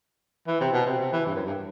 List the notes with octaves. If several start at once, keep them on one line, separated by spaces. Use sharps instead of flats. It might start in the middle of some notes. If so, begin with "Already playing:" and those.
E3
C3
B2
C3
C3
E3
G2
F#2
G2